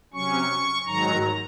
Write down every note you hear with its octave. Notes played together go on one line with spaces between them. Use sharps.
C3 F#3 C#4 C#6
G#2 D#3 F#3 A#5